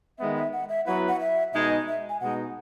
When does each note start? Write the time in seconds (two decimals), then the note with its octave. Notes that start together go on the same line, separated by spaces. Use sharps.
0.19 D#3 G#3 B3 E5
0.36 E5
0.53 F#5
0.69 E5
0.86 F#3 B3 E4 B4 F#5
1.08 F#5
1.20 E5
1.53 B2 G#3 D#4 G#4 D#5 E5
1.88 E5
2.09 G#5
2.20 B2 G#3 D#4 F#5